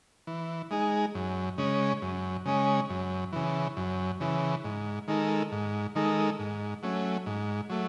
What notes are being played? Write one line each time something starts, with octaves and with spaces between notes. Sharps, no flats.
E3
G#3 D#4 G#4
F#2
C#3 G#3 C#4
F#2
C#3 G#3 C#4
F#2
C#3 E3
F#2
C#3 E3
G#2
D#3 G#3 D#4 A4
G#2
D#3 G#3 D#4 A4
G#2
F#3 A3 C#4
G#2
F#3 A3